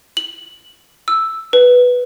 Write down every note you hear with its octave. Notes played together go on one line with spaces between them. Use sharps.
F#7
E6
B4